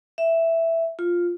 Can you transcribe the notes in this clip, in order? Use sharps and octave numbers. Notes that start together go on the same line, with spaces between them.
E5
F4